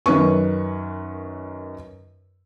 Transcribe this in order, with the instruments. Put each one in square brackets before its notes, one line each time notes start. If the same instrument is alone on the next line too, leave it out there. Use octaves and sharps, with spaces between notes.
[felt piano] F#2 D#3 C#4 B4 C#6